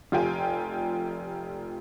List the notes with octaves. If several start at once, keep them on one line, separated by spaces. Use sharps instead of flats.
F1 F4 G4 G5 G#5